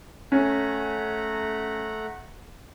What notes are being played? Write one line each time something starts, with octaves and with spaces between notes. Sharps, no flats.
A3 C#4 F#5 A#5